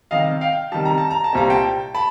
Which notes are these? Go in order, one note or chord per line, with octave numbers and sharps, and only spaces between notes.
C3 D#3 G3 D#5 F5
F5 G5
C3 D#3 G3 A5
A#5
A5
A#5
A5
C2 A#2 G3 C4 A#5
G5 A5
A5 B5